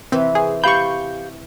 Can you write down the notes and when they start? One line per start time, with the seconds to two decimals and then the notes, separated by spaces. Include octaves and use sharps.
0.12 C3 E3 C4 B4
0.35 G#4 C5
0.64 G4 F5 B5 C#6 G6